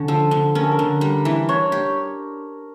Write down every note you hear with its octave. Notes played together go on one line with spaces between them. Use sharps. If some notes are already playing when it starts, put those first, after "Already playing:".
Already playing: D3 C#4
F3 A4
D3
C#4 A#4
A4
A#4
D3
G3
E3
D4 C#5
G4